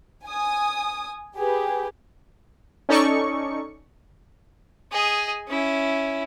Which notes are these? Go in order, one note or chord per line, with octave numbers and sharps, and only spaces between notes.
G#5 D#6
G4 G#4 B4
C#4 D#4 A4 D5 C#6 C#7
G#4 D#5
C#4 E4